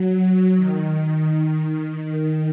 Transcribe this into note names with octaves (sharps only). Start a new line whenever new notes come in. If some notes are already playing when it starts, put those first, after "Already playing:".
Already playing: F#3
F#3
D#3